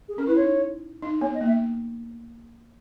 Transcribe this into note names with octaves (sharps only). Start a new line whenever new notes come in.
G#4
C#4 A#4
E4 B4
D#4 C#5
D#4
B3 C#5
D#5
A#3
E5